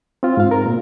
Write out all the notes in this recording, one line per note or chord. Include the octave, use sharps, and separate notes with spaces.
C4 F4
G#2 F5
A#4
A#2